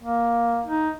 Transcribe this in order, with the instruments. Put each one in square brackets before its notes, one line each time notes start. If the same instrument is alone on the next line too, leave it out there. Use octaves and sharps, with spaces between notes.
[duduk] A#3
D#4